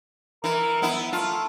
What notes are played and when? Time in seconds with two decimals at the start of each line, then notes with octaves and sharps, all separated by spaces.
0.44 E3 A#4
0.82 B3 E4
1.13 A3 F4